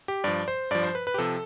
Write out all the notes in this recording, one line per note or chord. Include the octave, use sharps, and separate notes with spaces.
G4
G2 F3 D5
C5
G2 F3 D5
C5
B4
B4
G4
C3 F3 A4